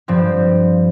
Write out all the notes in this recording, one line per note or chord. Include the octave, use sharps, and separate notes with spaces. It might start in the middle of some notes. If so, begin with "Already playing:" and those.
G2 F3 C4